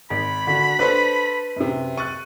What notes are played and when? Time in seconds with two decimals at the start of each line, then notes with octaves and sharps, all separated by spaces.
0.10 G#1 B5
0.47 D3 F#4
0.79 D4 A4 B4 C5
1.56 F#2 C3
1.97 C#6 F#6 A6 D#7